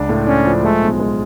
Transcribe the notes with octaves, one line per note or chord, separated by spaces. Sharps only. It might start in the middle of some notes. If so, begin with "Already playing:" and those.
Already playing: C#2 D4
A2
C#4 D4
F3
G#3 A3
B1
G#3